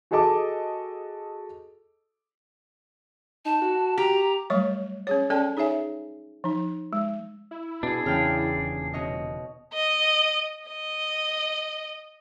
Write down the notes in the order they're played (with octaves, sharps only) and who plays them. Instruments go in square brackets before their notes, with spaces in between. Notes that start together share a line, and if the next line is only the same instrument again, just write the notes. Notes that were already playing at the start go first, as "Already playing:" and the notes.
[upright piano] F#4 G#4 A4 D#5 A5 D6
[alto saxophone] D#4 [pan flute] A5
[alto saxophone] F#4
[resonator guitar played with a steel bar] G4 [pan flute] A#5
[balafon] F#3 G3 A3 C#5 C#6
C#4 G#4 C#5
C#4 A4 D5 G5 A5
D#4 G#4 C#5 E5 G#5
F3 D#4
G#3
[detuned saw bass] E4
[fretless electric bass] B2 [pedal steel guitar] D4 G#4
[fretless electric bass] E2 C#3 [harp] B3 G5 F6
[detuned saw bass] D#1
[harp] B2 C#5 D#5
[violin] D#5
D#5